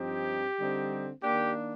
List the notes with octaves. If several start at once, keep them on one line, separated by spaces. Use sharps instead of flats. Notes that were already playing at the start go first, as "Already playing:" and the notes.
Already playing: G2 F3 C4 D#4 G4
D3 G3 C4 D#4
D#3 A#3 D4 G4